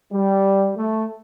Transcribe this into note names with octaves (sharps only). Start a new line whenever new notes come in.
G3
A3